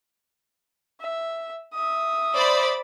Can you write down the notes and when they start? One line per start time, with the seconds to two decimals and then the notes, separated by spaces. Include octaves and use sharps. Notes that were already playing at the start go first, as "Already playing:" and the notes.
1.01 E5
1.74 E5 D#6
2.34 C5 D5 B5